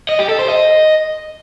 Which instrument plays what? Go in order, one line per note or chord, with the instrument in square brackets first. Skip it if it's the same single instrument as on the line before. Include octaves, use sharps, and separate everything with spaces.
[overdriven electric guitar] D#5
G4
A4
C5
D#5